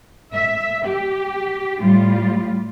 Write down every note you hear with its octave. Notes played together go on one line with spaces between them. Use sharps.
E5
G4
A2 G3 F4